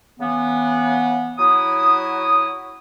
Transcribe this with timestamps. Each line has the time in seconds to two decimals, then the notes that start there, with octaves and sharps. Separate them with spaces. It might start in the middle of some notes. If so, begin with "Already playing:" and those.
0.20 C#3 E3 B3
1.38 F#3 E4 D#6